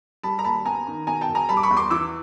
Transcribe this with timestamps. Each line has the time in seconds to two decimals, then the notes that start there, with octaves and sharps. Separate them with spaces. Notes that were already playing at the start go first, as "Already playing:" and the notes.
0.23 G3 A5 B5
0.39 A#5
0.44 D#2 A5 B5
0.65 B3 G#5 A#5
0.87 D#3
1.07 B2 G#5 A#5
1.21 G5 A5
1.28 E1
1.35 G#5 A#5
1.49 G3 A5 B5
1.57 D6
1.63 B5 C#6
1.71 E2
1.77 C6 D6
1.90 E3 D6 E6